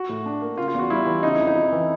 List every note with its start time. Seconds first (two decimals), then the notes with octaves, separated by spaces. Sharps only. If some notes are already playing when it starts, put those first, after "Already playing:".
Already playing: F#4
0.09 A2
0.26 D4
0.42 A#3
0.57 C#3 F4
0.68 F4
0.74 E2 F#4
0.90 G3 E4
1.06 E3
1.22 C#3 D#4
1.35 F2 E4
1.47 D#4
1.55 F2
1.72 E3